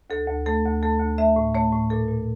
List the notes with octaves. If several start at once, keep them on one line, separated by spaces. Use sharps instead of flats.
D2 A4
D2
A3 A4
D2
A3 A4
D2
A3 E5
A2
A3 C#5
A2
A#2 A4
A#2